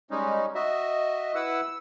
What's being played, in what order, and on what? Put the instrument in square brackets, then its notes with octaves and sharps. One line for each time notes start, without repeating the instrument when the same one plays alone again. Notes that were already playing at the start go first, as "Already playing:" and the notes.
[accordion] G3 C#4 D#4 [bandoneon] G#3
[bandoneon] F#4 E5 [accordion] D#5
[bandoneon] E4 B4 F#5 [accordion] E6